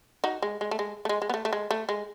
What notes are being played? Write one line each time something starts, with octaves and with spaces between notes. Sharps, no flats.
D#4 F#4
G#3
G#3
A3
G#3
A3
G#3
G#3
B3
A3
A3
G#3
A3
G#3